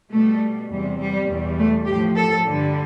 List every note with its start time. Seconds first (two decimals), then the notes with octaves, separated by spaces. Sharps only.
0.11 B2 G3 A3
0.70 E2 C3 G3
1.00 G3
1.28 E2 B2 G3
1.58 A3
1.87 A2 F3 G4
2.16 A4
2.46 G2 D3 G3